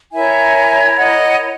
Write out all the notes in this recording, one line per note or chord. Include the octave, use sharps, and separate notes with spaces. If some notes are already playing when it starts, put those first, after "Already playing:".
E4 A#4 C#5 E5 G#5
D#5 F#5